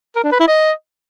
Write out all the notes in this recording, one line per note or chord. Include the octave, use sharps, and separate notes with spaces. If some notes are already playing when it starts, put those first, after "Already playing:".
A#4
D4
B4
E4
D#5